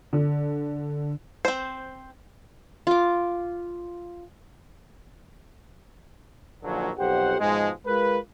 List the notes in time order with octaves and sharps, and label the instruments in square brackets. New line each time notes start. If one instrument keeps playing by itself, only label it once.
[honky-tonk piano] D3
[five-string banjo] C4 C5
[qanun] F4 D6
[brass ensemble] A#1 D#2 A#2 D3 F3 F#3
B1 F2 G4 C5 F#5
G#2 B2 F3 G#3
G#3 F4 A#4 B4